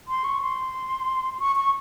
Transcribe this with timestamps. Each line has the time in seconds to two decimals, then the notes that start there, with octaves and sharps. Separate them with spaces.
0.08 C6
0.24 C#6
0.42 C6
1.40 C#6
1.56 C#6